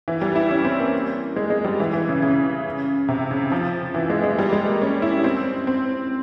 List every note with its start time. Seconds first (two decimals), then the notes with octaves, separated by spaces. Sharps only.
0.08 E3
0.22 G3
0.36 E4
0.51 C#4
0.65 C4
0.80 A#3
1.36 G#3
1.50 G#3
1.64 G3
1.80 E3
1.93 E3
2.09 C#3
2.22 C#3
3.08 C3
3.31 C#3
3.52 F3
3.94 E3
4.10 G#3
4.23 G#3
4.39 G3
4.53 G#3
4.67 A#3
4.82 C#4
5.02 E4
5.24 C4
5.67 C4